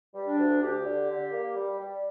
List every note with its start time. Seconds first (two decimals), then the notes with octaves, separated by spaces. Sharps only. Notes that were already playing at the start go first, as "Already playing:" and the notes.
0.15 G3
0.27 D4
0.38 D2
0.62 D2 G4
0.85 D3
1.09 D3
1.32 A#3
1.55 G3
1.79 G3